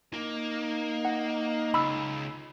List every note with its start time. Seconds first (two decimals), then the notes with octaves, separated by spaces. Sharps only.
0.14 A#3 D#4
1.05 F#5
1.74 C#2 B5 E6